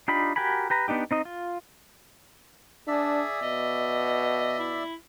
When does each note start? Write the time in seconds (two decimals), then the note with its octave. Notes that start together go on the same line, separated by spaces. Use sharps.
0.08 D4 D#4 F4 G4 B5
0.36 F#4 G4 A#4 G#5 B5
0.70 G4 B4 A#5
0.88 B3 D4 D#4 G4
1.11 C4 D#4 D#5
1.25 F4
2.87 D4 G#4 D5 E5
3.42 B2 D#5
4.59 E4